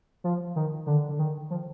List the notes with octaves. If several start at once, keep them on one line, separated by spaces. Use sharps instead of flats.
F3
D#3
D3
D3
D#3
F3